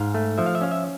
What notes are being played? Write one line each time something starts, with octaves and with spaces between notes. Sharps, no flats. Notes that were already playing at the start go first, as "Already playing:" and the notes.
Already playing: G#2 F5
A3
F3 E5
F5
E5
C#4 F5
E5